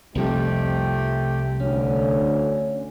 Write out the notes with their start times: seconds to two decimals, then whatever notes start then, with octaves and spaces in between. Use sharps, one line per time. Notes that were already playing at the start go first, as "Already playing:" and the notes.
0.15 C2 F2 C3 G3 A3 G4
1.60 D2 D3 C#4